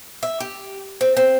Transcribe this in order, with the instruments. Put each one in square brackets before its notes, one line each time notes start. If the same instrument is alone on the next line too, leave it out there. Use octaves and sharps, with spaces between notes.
[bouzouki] E5
G4
C4
C4